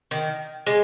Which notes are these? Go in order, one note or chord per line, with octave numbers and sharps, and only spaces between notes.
D#3
G#3